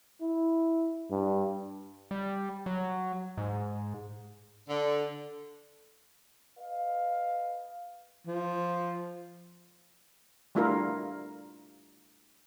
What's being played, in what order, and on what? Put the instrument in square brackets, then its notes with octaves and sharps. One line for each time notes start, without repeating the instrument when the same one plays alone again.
[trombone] E4
G2
[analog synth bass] G3
F#3
G#2
[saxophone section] D3
[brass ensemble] B4 D#5 F5
[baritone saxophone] F3
[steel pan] G3 A3 D4 E4 F4 A#4